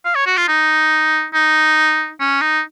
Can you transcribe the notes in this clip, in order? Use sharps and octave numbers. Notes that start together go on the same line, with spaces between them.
F5
C#5
F#4
F4
D#4
D#4
C#4
D#4